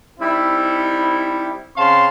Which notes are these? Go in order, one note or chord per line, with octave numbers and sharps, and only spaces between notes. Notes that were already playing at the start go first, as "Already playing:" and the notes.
G3 C4 D#4 E4
C#3 C4 F5 A5 C6